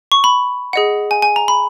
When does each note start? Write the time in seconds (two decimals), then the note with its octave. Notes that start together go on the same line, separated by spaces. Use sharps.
0.12 C#6
0.24 B5
0.73 G#4 D#5 F#5
1.11 G#5
1.22 G#5
1.36 A#5
1.48 B5